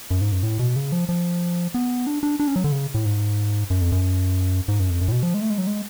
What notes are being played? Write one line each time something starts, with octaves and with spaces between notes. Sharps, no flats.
F#2
G#2
F#2
A2
B2
C#3
F3
F3
B3
D4
D4
D4
C#4
F#3
D3
C#3
A2
G#2
F#2
F2
F#2
G#2
F#2
F2
F#2
A2
B2
F3
G#3
A3
G#3
F#3
G#3